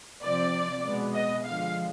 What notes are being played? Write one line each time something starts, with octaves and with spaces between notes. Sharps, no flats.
C3 F3 C4 D5
B2 G#3 B3
D#5
D3 F3 G#3 F5